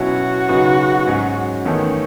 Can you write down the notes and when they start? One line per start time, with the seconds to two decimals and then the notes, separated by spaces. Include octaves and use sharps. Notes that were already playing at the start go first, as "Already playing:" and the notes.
Already playing: B2 F#3 C#4 E4 F#4
0.49 C#3 F#3 B3 D#4
1.06 G#2 F#3 C#4
1.65 E2 D#3 A3 C#4